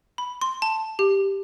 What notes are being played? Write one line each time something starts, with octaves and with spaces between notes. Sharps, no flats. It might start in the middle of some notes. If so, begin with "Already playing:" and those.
B5
C6
A5
G4